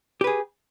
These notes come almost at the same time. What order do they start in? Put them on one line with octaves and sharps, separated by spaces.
G4 B4 G#4